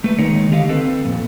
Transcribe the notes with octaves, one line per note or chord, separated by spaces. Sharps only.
A3 B4
D#3 G#3 A#3 D#4 A#4 C#5
D2 D3 G4 D#5 F5
C4 A4 B4
F2 A#2